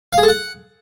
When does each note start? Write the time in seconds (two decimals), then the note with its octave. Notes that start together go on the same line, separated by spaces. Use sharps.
0.13 F5
0.18 G#4
0.23 A4
0.28 F#5